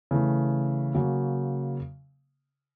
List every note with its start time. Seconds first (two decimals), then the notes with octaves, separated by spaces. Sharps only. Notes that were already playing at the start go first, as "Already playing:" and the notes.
0.11 C#3 E3 A3
0.94 C#3 F#3 A#3